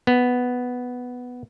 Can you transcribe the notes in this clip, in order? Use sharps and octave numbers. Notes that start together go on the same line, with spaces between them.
B3